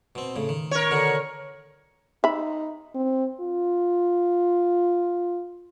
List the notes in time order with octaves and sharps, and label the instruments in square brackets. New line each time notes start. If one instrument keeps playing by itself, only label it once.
[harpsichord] B2 C4
A2 C#3
D#3
[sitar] A#4 C#5
[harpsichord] B2 D3 D#3
[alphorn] D#4 [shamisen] E5 B5
[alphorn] C4
F4